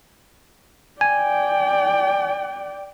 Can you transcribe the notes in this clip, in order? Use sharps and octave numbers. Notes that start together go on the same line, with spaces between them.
D5 G5 G#5